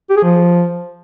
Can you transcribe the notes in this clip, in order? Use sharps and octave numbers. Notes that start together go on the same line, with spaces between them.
G4
G#4
F3